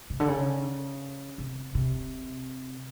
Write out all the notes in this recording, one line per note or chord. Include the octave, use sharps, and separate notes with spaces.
C3
D3
C#3
C3
C3